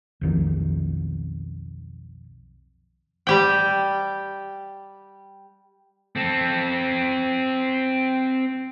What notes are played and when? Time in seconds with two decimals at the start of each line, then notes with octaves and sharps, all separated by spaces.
0.21 B1 F2 D#3
3.27 G3 G4 G5
6.16 C4 A4